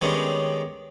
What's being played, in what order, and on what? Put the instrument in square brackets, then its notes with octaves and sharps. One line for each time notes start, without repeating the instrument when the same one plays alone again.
[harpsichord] D#3 G3 G#3 B3 C#4 D4